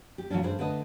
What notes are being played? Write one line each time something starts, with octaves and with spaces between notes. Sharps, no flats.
G4
A#2 E3 F#3 C#4 D4
G2 D4 G#4 C5
D3 A3 B4 D#5